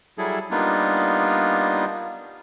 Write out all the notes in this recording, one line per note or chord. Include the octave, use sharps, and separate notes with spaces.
F#3 G3 E4 G#4 A4
G3 A#3 B3 D4 D#4 F4